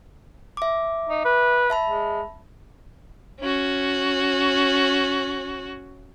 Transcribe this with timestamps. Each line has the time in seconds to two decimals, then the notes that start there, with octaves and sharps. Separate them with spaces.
0.57 E5 D6
1.09 D#4
1.25 B4
1.70 E5 A5 B5
1.86 G#3
3.40 C#4 F#4